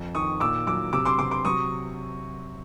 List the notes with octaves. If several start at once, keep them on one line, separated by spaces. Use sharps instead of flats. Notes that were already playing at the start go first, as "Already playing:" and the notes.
Already playing: F2
D#3 C#6 D#6
A#2 D6 E6
F#3 D6 E6
C3 D6 E6
C6 D6
C3 C6 D6
C6 D6
F#3 C#6 D#6